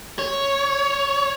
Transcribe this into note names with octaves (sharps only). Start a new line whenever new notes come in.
C#5